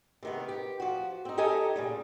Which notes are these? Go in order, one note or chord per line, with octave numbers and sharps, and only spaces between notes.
C3 D#3 B3
G4
F3 F#4
C4 D#4
D#4 G4 A4 D#5 G#5 A#5
A#2 C#3 G3